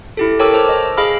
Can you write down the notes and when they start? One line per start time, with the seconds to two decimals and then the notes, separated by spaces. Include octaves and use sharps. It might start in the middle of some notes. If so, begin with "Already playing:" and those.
0.17 E4 G4 A4
0.39 A#4 C#5 G5 A5 D6 E6
0.54 C5 C#5 A5 E6
0.69 D#5
0.97 G#4 D#5 F5 B5 E6 F6